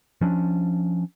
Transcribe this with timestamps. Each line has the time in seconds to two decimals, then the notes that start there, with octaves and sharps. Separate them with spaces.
0.21 F3 C#4 D4